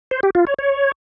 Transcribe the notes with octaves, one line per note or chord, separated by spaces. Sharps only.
C5
G4
F4
C#5
C#5